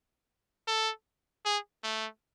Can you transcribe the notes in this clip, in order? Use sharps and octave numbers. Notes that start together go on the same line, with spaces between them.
A4
G#4
A3